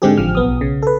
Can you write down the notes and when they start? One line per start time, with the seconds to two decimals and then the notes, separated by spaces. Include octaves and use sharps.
0.02 G#2 D3 G#3 C4 G4 G#4
0.18 A1 F3 F6
0.35 B1 B3 D#6
0.61 C#3
0.82 A4 B4